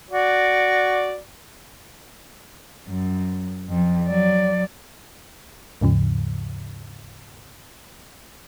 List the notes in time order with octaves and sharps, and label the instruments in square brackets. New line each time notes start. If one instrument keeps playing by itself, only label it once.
[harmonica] F#4 D5
[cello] F#2
F2
F#3 D5
[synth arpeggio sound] D#2 G#2 C#3 F3